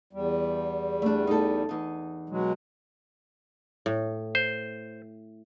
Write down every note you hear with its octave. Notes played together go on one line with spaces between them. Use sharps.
E2 G3
A3 D4
D#4 A4
E2 D#4
B2 F#3 G#3
A2
C5